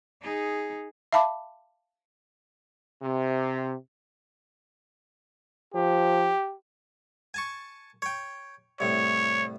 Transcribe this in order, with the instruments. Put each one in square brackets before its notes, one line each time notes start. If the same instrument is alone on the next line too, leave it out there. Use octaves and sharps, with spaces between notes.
[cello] D#4 G#4
[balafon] E5 F5 A5 B5 D6
[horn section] C3
[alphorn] F3 [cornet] G4
[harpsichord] G#5 A5 C#6
C#5 G5
[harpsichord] C2 A2 [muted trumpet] C#5